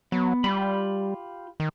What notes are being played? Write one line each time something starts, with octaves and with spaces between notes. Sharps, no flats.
F#3 B3
G3 F4 G4 B5
D#3